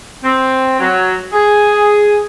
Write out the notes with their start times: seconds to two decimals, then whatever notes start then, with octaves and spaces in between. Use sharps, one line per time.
0.24 C4
0.80 F#3
1.33 G#4